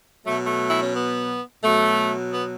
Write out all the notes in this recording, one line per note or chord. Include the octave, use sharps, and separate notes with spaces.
B2 F#3 A3
A3
E4
C#4
B3
B2 F#3 A3
B3